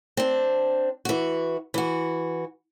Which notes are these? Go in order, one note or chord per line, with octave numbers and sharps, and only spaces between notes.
C4 D4
E3 F#4
E3 F#4